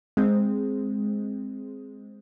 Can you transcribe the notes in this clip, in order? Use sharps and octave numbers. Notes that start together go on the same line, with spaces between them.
G#3 C4